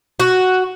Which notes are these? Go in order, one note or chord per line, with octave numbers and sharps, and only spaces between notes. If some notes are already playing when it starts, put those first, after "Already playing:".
F#4